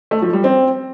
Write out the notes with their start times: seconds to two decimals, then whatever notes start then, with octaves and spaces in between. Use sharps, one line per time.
0.11 A3
0.22 F3
0.33 G3
0.44 C4